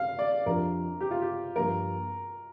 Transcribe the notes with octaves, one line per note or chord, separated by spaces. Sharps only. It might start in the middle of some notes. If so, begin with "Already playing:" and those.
Already playing: F5
D5
F2 F3 D4 G4 A#4
G4
F4
G4
G2 F3 A#3 G4 A#4